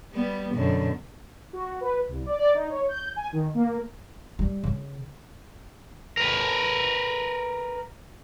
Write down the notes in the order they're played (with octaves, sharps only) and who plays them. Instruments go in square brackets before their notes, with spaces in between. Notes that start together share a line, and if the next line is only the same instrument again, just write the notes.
[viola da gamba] G3 B3
F#2 B2 D3
[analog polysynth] F#4
B4
C2
D5
D5
D#4
C#5
G6
G#5
D#3
A#3
[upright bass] G3
C#3
[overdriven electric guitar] A#4 B4